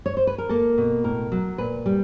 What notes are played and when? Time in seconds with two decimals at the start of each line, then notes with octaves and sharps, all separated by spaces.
0.06 C#5
0.17 C5
0.27 B4
0.38 A#4
0.49 A#3 A4
0.78 B2
1.04 A2 A#4
1.32 F#3
1.58 A#2 B4
1.86 G3